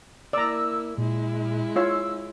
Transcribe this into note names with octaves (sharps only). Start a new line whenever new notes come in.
A#3 E4 D5 A#5 E6
A#2 G#3 E4
F4 C#5 E6